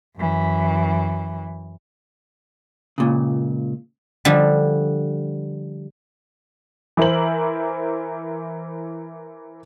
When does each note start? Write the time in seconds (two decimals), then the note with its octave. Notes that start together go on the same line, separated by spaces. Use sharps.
0.17 F#2 E3
2.98 C#2 A#2 C#3
4.25 D3 F3 G3
6.97 E3 E4 A#4 C5 F#7